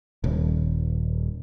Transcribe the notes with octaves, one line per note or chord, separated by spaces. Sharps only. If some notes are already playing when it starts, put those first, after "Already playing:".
D#1